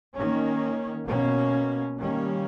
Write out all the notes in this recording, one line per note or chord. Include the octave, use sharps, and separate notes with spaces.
D#3 A#3 C#4
B2 A#3 C#4
D#3 G3 A#3 C#4